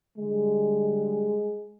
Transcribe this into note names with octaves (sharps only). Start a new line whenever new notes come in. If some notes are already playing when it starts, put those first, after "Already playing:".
D3 G3 G#3